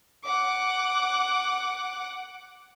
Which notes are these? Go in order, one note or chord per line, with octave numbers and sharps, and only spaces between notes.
F#5 D6